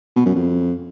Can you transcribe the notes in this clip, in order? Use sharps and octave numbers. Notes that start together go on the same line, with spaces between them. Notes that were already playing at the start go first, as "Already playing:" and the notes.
B2
F#2
F2